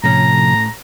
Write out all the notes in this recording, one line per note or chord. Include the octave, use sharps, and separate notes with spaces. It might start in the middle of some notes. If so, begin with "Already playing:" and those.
A2 C3 F3 C#4 A#5